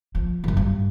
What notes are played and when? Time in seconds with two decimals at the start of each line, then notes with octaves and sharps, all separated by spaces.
0.15 F3
0.44 A1 F#2
0.57 G2